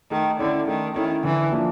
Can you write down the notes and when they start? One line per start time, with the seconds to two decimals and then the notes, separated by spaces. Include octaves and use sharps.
0.11 D#3 A3
0.39 D3 C#4 E4 A4
0.68 D#3 A3
0.96 D#3 C#4 E4 A4
1.24 D3 E3
1.51 F3 A#3 D4